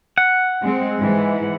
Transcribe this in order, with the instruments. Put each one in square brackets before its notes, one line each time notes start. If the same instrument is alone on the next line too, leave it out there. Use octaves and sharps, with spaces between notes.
[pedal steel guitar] F#5
[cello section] G#3 C4
G#2 E3 G#3